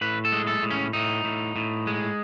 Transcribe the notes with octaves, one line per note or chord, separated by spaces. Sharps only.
A2 B4
A4
G#3
A4
A2
C#4
A2 D#4
A2
A2
G#3